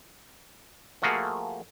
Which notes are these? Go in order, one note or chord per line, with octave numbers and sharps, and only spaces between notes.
F3 A3 A#3 F#4 G#4 F5